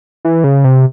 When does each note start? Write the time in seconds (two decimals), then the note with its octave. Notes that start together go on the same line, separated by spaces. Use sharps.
0.25 E3
0.44 C#3
0.64 C3